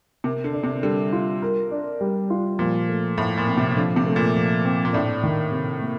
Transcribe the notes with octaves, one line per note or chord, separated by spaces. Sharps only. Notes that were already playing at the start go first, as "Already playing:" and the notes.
C3 A#4
D3
D4
C3
D3 G3
F4
A#4
D4
G3
F4
A#2 F3
A3
A2 F3
A#2
C4
C3
D3 F3
C3
A3
A#2
F3
C4
A#2
A2 D4
D#3
C3
A#3